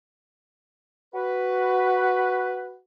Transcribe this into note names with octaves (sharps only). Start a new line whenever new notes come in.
F#4 B4